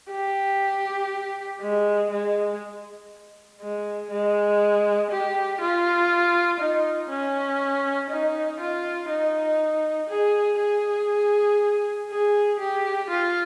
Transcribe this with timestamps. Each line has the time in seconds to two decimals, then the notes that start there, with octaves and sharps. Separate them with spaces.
0.11 G4
1.61 G#3
2.11 G#3
3.61 G#3
4.11 G#3
5.11 G4
5.60 F4
6.60 D#4
7.10 C#4
8.10 D#4
8.60 F4
9.10 D#4
10.10 G#4
10.60 G#4
12.10 G#4
12.59 G4
13.10 F4